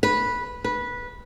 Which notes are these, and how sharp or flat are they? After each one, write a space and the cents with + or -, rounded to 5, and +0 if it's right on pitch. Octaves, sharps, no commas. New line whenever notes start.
B4 -10
B4 -15